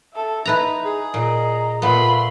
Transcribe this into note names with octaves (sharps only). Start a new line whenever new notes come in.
A4 E5
D#4 E4 B4 A#5
G#4
A#2 D#5 A#5
A#2 A3 B3 F4 B5 C6